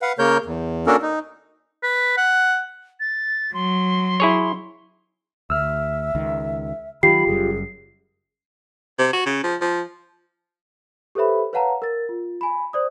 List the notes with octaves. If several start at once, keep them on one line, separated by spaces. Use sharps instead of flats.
B4 F5 F#5
C#3 A#3 A#4 C#5 G6
E2
A#3 C#4 D4 F#4 A4 A#4
D#4
B4
F#5
A6
F#3 C6
E4 G#4 C#5
D2 E5 E6 F6
C#2 D#3
D#3 F#3 F4 G4 B5 C7
F#1 F#2 G3 G#4
C3
F#4
C#3
F3
F3
G4 A4 B4 C5 E5 B5
B4 C#5 F5 F#5 A5 A#5
A#4 A6
F4
G#5 B5
C5 D5 D#6